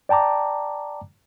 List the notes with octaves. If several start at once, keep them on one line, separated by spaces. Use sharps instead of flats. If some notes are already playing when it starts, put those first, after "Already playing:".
D5 G5 A5 A#5 D6